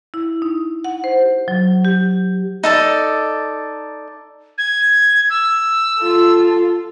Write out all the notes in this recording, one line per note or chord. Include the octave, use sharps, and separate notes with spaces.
E4
D#4
F#5
C5
G4
F#3
G4
D#4 A4 D5
G#6
E6
F4 A4